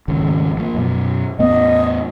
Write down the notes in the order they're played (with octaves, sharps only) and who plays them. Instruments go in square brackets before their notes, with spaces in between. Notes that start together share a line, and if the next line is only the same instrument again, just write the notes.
[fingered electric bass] G#1 D#2 C#3
F3 F#3 A#3
F#2 B2
[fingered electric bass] E2 A2 B3 [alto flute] D#5